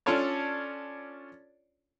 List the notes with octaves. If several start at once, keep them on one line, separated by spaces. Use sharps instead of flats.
C#4 D4 F4 A4 C#5 D5